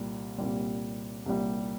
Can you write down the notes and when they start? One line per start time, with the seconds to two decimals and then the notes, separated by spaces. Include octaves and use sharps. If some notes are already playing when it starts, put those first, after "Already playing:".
Already playing: C2 A#2 G3
0.38 C2 A#2 G3
1.26 C2 A#2 G3